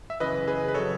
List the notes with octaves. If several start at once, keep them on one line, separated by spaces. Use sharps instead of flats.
E5
F#2 C#3 E3 B4 D#5
G#4 B4
B4
C#3 F#3 A4 C#5